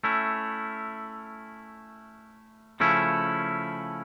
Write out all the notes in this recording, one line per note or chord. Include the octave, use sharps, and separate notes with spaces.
A3 C#4 E4
C#3 F3 A3 C#4 E4